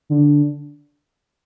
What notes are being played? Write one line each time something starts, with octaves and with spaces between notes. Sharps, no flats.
D3